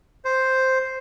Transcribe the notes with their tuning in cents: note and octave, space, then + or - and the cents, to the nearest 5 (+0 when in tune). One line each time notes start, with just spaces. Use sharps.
C5 +0